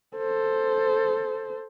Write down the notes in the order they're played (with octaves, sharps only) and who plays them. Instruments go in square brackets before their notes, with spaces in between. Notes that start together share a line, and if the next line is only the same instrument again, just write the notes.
[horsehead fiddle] A4 C5